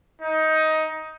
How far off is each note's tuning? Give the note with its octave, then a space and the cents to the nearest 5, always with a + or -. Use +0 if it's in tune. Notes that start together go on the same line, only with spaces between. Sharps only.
D#4 +15